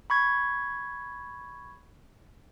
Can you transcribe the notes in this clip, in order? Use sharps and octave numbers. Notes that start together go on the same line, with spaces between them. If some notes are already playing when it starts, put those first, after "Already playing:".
B5 C#6 G#6